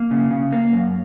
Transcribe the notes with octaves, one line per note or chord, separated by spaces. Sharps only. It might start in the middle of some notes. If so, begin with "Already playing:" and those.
Already playing: A#3
C#3
C#3
A#3
F#2